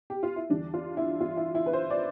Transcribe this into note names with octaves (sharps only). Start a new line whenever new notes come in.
G4
F4
E4
E2 D3 G3 D4
F4
E4
F4
E4
E4
B4
C5
D5